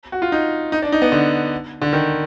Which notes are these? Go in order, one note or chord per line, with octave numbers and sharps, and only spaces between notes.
F#4
F4
D#4
D#4
D4
D#4
B3
D3
D3
D#3